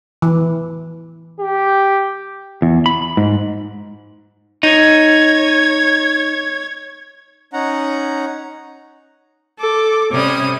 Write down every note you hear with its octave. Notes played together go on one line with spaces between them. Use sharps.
E3
G4
E2
B5
G#2
D#4 C#5 G#6
C#4 D#4 F#5 A#5
A4 D6
C3 G3 C#4 D#6